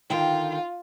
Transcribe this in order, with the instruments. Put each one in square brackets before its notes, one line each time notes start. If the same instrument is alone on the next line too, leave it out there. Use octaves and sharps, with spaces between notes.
[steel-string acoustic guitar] D3 D#3 G5 [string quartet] F4